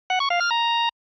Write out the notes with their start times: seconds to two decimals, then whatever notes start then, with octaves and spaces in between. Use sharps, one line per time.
0.10 F#5
0.20 C#6
0.30 F5
0.40 F6
0.51 A#5